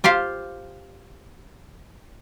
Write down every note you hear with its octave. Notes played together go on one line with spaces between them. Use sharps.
F4 G4 C5 F5